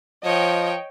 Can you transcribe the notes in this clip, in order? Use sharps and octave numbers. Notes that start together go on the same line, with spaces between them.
F3 C#5 D#5 G5